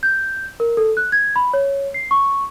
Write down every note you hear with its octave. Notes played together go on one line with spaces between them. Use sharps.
G6
A#4
A4
F#6
G#6
B5
C#5
C7
C#6